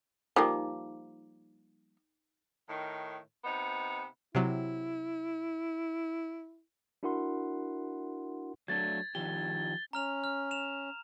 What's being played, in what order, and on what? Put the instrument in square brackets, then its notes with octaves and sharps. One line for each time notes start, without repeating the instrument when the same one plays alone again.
[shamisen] F3 G3 A#3 [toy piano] D#4 D6
[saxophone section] A2 D#3
C3 B3 D#4
[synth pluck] C3 F#3 [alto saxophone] E4
[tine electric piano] D4 E4 F#4 A#4 F#5 C6
[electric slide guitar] F#3 A3 D4 [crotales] G#6 A6
[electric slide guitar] D#3 F3 G4 [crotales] G7
[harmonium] C#4 [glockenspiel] A#5 F6 F7
[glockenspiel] F6
E7 F7